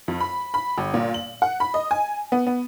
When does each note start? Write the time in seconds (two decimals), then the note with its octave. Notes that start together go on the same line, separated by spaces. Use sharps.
0.08 F2
0.20 B5
0.54 B5
0.78 G1
0.94 A#2
1.14 F#7
1.42 F#5
1.60 B5
1.74 D#5
1.91 G#5
2.32 B3
2.47 B3